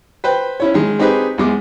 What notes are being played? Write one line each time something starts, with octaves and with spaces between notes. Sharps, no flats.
B4 C5 G5
C#4 E4 C#5
D#3 G#3
C4 D#4 G4 G#4 B4
E2 G#3 D6